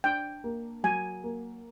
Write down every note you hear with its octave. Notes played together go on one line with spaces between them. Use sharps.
D4 G5
A#3
F#3 G#5
A#3